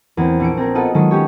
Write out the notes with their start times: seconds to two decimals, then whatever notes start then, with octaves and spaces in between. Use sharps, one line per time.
0.17 E2 A#3 C4
0.40 A#1 C#7 D7
0.57 C4 G#4 A#4
0.75 A#3 B3 F4 A4 D#5 F#5
0.94 D#3 F#3 G#3 F4 A4
1.10 C#4 G4 C#5